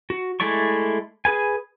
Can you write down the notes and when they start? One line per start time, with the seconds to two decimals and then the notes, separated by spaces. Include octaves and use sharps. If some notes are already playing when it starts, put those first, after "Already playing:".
0.10 F#4
0.40 G#3 A3 E4 D5 C#6
1.25 G#4 B4 G#5